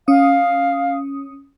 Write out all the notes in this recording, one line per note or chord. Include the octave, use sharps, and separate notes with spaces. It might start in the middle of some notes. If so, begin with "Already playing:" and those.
C#4 F5 D#6